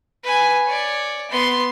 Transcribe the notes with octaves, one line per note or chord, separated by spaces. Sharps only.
B4 G#5
C#5 D5
B3 C6